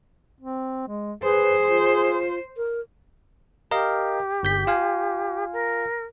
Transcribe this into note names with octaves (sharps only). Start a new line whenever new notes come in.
C4
G#3
G#4 B4 C5
F4
A#4
G4 A#4 D#5 F5
G1 G6 B6
F4 F5 G#5
A#4